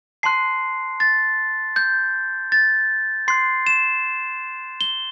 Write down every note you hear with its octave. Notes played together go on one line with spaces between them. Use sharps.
A5 C6 F#6 C7
A6
G6
A6
C6 F#6 C7
E7
G7